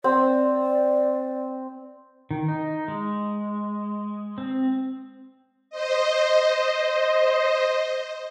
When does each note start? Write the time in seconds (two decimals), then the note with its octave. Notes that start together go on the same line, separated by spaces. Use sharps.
0.04 C4 D5
2.31 D#3
2.48 D#4
2.88 G#3
4.38 C4
5.70 C5 D#5